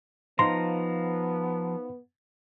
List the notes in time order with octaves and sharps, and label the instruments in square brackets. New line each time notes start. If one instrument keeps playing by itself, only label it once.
[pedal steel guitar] F3 A#5 [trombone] B3 [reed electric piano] D#4 C5 F5 [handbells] C6